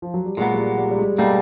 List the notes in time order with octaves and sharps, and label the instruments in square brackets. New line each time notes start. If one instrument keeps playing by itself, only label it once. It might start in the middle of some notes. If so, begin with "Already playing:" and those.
[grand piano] F3
F#3
G3
[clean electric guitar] A#2 F#3 B3 [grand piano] G#3
[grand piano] G3
G#3
G3
G3
G#3
[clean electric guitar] B2 G3 A#3 D#4 [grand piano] A3